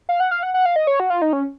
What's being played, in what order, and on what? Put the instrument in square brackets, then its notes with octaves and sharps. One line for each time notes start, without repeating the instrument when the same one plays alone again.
[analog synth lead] F5
F#5
F5
F#5
F#5
F5
D#5
C#5
F#4
F4
D#4
C#4